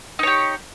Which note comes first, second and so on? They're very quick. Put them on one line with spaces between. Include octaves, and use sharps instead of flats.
D#4 C#5 G4